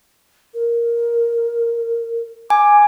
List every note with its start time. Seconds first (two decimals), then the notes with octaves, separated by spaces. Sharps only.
0.54 A#4
2.50 G#5 D6